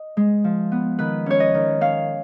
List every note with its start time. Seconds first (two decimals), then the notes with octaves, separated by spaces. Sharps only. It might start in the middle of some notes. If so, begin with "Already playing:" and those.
Already playing: D#5
0.17 G#3
0.44 F3
0.72 B3
0.99 D#3 B4
1.26 C#4 C#5
1.40 D#5
1.54 D#3
1.81 C#4 F5